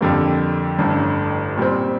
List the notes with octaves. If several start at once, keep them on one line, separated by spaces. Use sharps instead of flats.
F2 D3 G3 A#3
A1 G2 D3
A#2 G3 C4